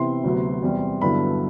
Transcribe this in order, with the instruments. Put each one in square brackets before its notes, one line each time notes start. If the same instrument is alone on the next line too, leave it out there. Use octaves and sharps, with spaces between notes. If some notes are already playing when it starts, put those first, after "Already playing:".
Already playing: [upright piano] C3 E3 B3 E4 C6
D2 C3 F#3 B3
E2 C3 G3
G2 D3 F#3 B3 E4 B5